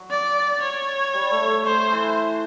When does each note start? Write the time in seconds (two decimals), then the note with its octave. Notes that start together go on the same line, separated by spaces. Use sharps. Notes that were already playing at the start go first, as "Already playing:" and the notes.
Already playing: F#3
0.11 D5
0.62 C#5
1.14 G3
1.31 A3
1.48 A3
1.66 A3 C5
1.91 E3